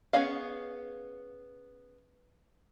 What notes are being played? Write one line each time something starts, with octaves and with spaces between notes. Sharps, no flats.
B3 C#4 G#4 D#5 F5